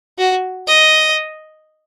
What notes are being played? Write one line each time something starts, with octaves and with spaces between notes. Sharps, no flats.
F#4
D#5